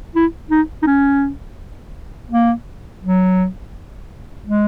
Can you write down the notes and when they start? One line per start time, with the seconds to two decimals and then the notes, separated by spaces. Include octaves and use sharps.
0.15 E4
0.51 D#4
0.82 D#4
0.87 C#4
2.30 A#3
3.03 F#3
4.47 G#3